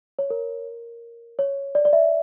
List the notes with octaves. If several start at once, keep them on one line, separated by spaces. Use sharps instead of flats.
C#5
A#4
C#5
D5
D5
E5